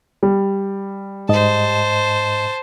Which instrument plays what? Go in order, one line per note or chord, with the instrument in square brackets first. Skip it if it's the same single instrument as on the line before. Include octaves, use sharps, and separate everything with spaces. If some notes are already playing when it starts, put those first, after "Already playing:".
[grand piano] G3
[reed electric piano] G#2 D#5 [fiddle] C5 A5